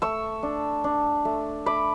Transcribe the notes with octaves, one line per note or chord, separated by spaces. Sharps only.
A3 C#6 E6
D4
D4
A3
A3 B5 D6